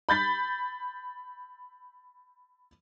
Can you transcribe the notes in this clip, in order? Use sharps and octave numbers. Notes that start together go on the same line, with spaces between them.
B5 G6 A6 B6